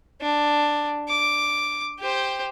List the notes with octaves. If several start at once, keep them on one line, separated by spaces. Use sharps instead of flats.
D4
D6
G4 C5